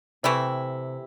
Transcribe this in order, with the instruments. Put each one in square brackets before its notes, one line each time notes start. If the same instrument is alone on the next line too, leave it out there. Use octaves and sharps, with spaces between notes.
[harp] C3 [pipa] E3 A3 E4